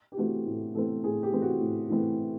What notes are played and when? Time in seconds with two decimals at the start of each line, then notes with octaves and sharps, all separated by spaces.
0.12 G4
0.17 E3 A3 C4 F#4
0.46 A2
0.75 E3 A3 C4 A4
1.03 A2 G#4
1.23 G4
1.32 E3 A3 C4
1.42 F#4
1.61 A2
1.90 E3 A3 C4